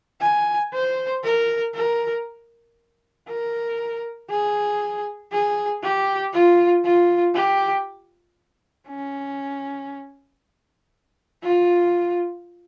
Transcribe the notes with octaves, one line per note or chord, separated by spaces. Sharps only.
G#5
C5
A#4
A#4
A#4
G#4
G#4
G4
F4
F4
G4
C#4
F4